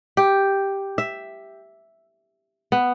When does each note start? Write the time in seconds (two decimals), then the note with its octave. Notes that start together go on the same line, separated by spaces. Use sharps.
0.17 G4
0.98 E5
2.72 B3